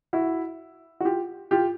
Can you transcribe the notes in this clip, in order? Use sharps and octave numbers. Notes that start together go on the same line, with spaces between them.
E4 F#4
F#4
F4 G4
F4 G4